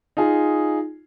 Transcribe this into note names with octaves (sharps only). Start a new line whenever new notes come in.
D#4 F4 G#4